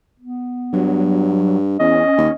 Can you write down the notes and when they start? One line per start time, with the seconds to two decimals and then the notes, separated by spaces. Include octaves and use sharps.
0.20 B3
0.73 G2 F#3
1.80 E2 C#4 D#5
2.18 D#2